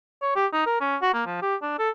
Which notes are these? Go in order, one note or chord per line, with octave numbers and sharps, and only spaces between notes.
C#5
G4
D#4
A#4
C#4
F#4
A#3
F3
G4
D4
A4